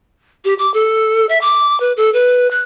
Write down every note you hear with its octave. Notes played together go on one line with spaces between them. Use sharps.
G4
D6
A4
E5
D6
B4
A4
B4
F#6